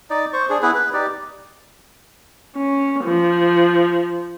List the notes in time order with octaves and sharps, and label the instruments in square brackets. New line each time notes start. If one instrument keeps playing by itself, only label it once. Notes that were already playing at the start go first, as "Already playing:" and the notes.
[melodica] D#4 D5
C5 C#6
D4 G#4
B3 E4 G#4 B4
B4
D#4 G4 D5
[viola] C#4
F3